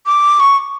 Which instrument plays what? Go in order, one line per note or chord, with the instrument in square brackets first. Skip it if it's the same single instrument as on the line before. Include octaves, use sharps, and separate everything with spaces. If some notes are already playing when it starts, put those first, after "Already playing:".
[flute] D6
C#6